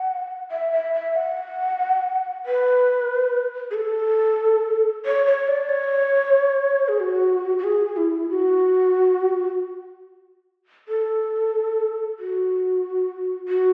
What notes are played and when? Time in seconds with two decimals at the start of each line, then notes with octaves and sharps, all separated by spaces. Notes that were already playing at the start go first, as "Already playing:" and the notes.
Already playing: F#5
0.51 E5
0.72 E5
0.93 E5
1.16 F#5
2.46 B4
3.71 G#4
3.75 A4
5.05 C#5
5.26 C#5
5.48 D5
5.69 C#5
6.88 G#4
7.00 F#4
7.58 F#4
7.64 G#4
7.96 E4
8.30 F#4
10.88 A4
12.19 F#4
13.48 F#4